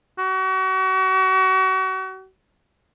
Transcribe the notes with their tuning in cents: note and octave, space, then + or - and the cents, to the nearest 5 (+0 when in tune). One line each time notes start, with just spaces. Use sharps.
F#4 +35